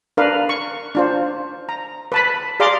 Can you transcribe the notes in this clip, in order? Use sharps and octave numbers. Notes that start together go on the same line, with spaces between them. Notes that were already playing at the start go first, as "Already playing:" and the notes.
D4 A#4 B4 F5
C#6
D4 F4 C5
A#5
B4 A5 B5
G#4 D5 F5 A#5 C6 D6